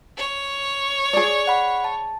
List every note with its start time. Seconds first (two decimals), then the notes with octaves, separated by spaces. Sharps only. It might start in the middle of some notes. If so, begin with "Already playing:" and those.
0.17 C#5
1.13 G#4 D5
1.47 F#5 B5
1.84 A5